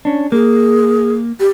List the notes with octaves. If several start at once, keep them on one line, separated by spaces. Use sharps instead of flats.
C#4 D4
A#3 G#4
G4